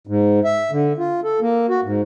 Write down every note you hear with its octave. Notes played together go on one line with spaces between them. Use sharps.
G#2
E5
D3
F4
A4
A#3
F#4
G#2